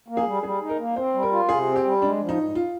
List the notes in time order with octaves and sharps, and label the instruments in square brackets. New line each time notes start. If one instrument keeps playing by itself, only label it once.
[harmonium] A#3
[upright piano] G#4
[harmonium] G3
[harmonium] G3 [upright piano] G#4
[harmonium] D#4
[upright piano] A#4
[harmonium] A#3
[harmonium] C4 [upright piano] C5
[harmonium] G3
[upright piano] A#4
[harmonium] F4
[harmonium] C3 [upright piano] G#4
[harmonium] C4
[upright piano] G4
[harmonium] G3
[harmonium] G#3 [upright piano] D4
[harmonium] F3
[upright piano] D#4
[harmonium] G#2
[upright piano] F4